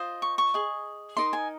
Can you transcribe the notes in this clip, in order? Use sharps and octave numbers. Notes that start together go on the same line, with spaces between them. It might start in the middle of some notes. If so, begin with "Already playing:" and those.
Already playing: F4 C5 D#5
C#6
C#6
G#4 D#5
D#4 A#4 D#5 C6
G#5